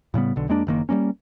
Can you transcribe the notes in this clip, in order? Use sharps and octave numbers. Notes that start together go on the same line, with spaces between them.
A2 C#3 G3 B3
B1 D3
F2 G#3 A#3 D4
F#1 D#3 A#3
G3 G#3 A#3 C#4